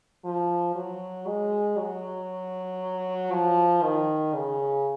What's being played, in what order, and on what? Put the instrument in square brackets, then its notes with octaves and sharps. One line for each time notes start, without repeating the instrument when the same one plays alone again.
[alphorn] F3
F#3
G#3
F#3
F3
D#3
C#3